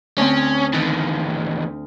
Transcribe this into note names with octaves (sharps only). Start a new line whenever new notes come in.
D2 C4 C#4
E2 D#3